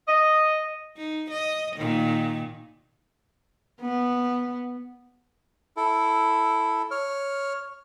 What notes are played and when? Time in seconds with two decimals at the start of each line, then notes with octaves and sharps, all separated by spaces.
0.07 D#5
0.97 D#4
1.31 D#5
1.77 A#2 D#3
3.81 B3
5.77 E4 A4
6.91 C#5 F6